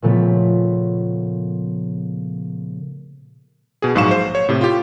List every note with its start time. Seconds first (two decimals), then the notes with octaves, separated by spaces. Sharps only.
0.02 A#2 C#3 F3 A3 B3
3.82 B2 G#4
3.95 A#1 G#2 F#3 F5 C#6 E7
4.11 C5
4.35 C#5
4.49 A2 C3
4.61 F4 G4